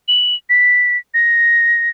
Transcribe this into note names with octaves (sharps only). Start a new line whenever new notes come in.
F#7
B6
A#6